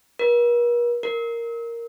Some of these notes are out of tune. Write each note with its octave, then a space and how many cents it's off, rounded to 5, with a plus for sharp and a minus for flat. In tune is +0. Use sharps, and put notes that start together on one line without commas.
A#4 +45
A#4 -5